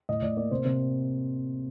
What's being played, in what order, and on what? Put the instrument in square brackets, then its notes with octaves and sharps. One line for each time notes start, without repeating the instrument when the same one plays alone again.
[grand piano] A2 D#5
A2 D5
A#3 D5
C3 C5
C3 C5